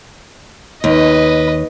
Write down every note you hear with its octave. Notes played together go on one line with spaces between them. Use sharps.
D#2 B4 D#5